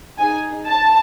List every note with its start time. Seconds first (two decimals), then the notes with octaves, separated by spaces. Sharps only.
0.18 D#4 G#4 G#5
0.68 A5